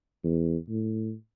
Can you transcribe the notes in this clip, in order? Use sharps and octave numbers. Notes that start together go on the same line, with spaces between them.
E2
A2